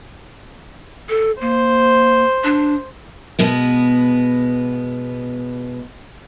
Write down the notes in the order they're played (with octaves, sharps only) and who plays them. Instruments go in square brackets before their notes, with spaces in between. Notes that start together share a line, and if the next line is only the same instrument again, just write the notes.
[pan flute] A4
[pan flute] A#3 [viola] C5
[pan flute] D4
[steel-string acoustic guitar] B2 G#3 B3